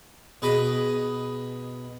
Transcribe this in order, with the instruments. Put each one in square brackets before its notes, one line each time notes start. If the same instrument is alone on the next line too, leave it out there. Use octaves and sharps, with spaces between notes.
[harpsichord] B2 G#4 B4 D#5 B5